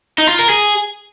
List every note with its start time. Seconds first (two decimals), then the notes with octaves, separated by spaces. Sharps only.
0.18 D#4
0.29 F4
0.39 A#4
0.50 G#4